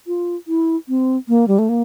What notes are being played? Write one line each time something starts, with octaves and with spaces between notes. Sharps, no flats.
F4
E4
C4
A#3
G3
A3
A#3